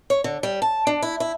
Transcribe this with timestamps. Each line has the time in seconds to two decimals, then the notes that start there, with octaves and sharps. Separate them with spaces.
0.10 C#5
0.24 D3
0.43 G3
0.62 A5
0.87 D4
1.02 E4
1.20 E4